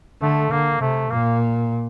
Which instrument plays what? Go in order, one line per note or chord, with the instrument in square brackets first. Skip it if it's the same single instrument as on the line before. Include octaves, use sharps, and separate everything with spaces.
[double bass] D3 [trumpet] A3
[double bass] D3 [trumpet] A#3
[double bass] C3 [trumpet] A3
[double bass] A#2 [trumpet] A#3